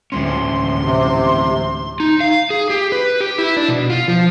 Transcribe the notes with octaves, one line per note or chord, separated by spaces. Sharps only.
D2 A2 E3 G#3 C#4 C6
C3
D#4
F5
G#4
G4
B4
G4
E4
D4
B2
F4
F3